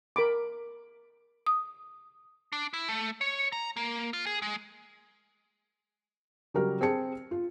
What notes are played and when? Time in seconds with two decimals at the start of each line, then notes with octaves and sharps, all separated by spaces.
0.16 A#4 B5 D6
1.46 D#6
2.53 D4
2.74 E4
2.89 A3
3.21 C#5
3.52 A#5
3.76 A#3
4.13 F4
4.26 G#4
4.42 G#3
6.54 C#3 F#3 G3 G4 A#4 F6
6.81 C4 G#4 A5 C#7
7.31 F4